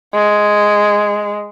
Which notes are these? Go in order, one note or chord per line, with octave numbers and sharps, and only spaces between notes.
G#3